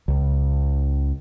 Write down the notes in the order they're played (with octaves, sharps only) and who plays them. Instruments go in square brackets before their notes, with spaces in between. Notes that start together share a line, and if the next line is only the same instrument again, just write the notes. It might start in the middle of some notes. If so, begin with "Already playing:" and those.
[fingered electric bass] C#2